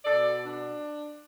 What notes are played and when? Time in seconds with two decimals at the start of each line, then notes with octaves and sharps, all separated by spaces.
0.05 B2 A4 D5
0.43 D4